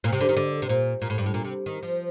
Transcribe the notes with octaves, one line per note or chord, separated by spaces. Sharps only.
A#2
C3
D3
D#3
D3
C3
A#2
A#2
A2
G2
A2
A#2
C3
D#3
F3